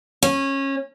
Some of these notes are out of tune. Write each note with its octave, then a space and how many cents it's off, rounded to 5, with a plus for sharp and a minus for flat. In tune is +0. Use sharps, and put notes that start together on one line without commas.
C#4 -20